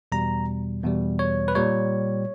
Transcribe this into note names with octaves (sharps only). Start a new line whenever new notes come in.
E2 B2 G3 A#5
E2 B2 G3
C#5
B4
A#2 G3 C#5